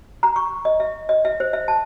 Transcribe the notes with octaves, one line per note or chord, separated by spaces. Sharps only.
A#5
C#6
D#5
E5
D#5
E5
C5
E5
A5